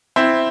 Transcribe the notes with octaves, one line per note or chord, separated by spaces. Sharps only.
C4 E4